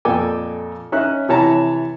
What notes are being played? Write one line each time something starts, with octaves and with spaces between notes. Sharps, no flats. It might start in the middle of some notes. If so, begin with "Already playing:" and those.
F2 A#2 A4 G5 G#5 D6
C#4 D#4 E5 F#6
C3 E3 C#5 A5 A#5